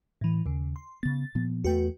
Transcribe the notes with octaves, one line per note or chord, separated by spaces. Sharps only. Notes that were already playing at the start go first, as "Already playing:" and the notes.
A2 E3
D#2 C#3
C6
C#3 B3 A6
A#2 F3 B3
E2 A3 F#4 B4 G5